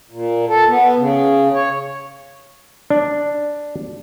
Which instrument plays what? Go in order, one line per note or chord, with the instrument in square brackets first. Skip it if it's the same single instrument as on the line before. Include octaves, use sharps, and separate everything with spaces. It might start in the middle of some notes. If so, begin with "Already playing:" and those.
[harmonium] A#2
A4
B3
C#3
C#5
[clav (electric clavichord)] D4